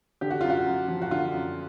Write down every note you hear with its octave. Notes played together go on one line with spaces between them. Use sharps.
D3 G4
F#4
F#2 F4
F#4
F#2
F3
F#4
D3 F4
F#2